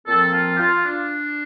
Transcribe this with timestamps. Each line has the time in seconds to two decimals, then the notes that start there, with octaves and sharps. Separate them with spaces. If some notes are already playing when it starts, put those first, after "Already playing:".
0.07 A#2 F3 C4 A4
0.33 F4
0.55 G4
0.60 F4
0.85 D4